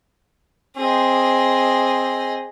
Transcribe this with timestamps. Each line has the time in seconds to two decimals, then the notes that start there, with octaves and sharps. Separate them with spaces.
0.77 C4 G#4 D#5